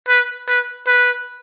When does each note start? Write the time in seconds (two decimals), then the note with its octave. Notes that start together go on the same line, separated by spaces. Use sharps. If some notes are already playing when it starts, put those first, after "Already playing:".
0.08 B4
0.48 B4
0.87 B4